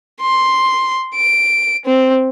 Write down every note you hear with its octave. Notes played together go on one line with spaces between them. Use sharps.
C6
D7
C4